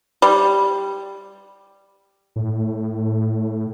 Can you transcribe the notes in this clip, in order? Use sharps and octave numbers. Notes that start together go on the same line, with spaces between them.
G3
A2